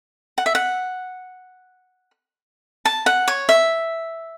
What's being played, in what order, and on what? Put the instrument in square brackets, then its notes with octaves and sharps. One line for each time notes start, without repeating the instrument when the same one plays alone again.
[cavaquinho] F#5
E5
F#5
A5
F#5
C#5
E5